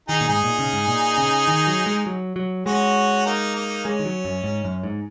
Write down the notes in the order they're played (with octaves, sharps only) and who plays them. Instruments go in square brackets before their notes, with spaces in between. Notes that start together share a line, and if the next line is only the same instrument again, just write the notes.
[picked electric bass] D#3 [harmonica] D#4 G#4
[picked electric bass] A#2
[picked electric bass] G#2 [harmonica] D#4 G#4
[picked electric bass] A#2
C#3
G#2
A#2
C#3
D#3
F#3
G#3
F#3
F#3
[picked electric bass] G#3 [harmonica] C#4 F#4
[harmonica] A#3 D#4
A#3 D#4
[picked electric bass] G#3 [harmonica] C#4
[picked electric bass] D#3
F#3
F#2
G#2
F#2
G#2